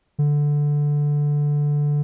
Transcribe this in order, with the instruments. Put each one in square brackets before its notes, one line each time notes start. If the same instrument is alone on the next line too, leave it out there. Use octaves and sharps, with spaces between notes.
[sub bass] D3